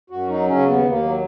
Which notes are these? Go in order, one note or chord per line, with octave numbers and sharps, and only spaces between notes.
F#2 F#4
F#3 D#4
C#3 C#4
D#2 B3
D#2
A#3
F#3